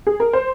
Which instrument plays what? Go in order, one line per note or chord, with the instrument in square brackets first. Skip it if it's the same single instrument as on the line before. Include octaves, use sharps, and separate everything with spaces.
[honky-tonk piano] G#4
A#4
C5